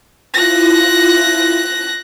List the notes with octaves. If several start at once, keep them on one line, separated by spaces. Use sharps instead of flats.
E4 F4 F#6 A#6